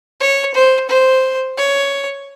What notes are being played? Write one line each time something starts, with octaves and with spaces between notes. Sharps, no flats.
C#5
C5
C5
C#5